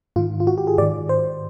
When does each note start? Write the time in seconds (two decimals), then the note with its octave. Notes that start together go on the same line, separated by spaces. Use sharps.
0.16 G#2 D#3 F4
0.40 F4
0.47 F#4
0.58 G4
0.67 G#4
0.78 G#2 D#3 D5
1.09 C5